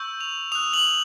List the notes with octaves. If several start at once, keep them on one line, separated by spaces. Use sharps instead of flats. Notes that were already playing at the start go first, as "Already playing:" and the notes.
Already playing: C#6 E6 G6
F7
D#6 F#6 F7
F#7